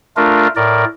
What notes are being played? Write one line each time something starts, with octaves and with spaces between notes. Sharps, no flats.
A3 D4 F4 A#4
A2 A#4 D5